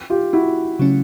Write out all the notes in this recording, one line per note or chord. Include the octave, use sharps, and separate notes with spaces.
F4 G4
E4 F#4
C#3 F#3 A3 C#4